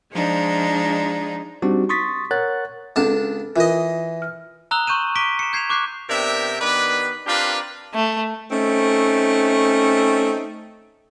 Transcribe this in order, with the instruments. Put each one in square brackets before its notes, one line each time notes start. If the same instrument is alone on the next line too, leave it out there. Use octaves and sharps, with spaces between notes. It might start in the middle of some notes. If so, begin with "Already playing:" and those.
[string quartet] F3 G#3 D4 D#4
[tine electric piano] G3 C4 D4 D#4 F#4 G4
C6 C#6 D#6 A6 B6
A#4 C#5 F#5 F#6 A6
[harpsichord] C#2 D4 A5 [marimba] C4 A4 F#5
[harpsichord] E3 D#5 [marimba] F4 A#4
[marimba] F6
[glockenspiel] A#5 D#6 E6 F#6 F7 G7
C6 C#6 G6 D#7 E7
A#5 D6 B6 D7 D#7 G7
C#7 E7
G6 G#6 C7 C#7 E7 F7
C#6 D6 F#6 G6 C7
[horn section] C3 B3 D4 A#4 E5 G5
D#3 B3 D4 G4 B4
C4 D4 F4 G4 A#4 B4
[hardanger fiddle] A3
[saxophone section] A3 C4 C#4 D#4